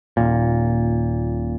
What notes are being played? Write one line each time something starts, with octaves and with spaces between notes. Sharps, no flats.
D#1 A#2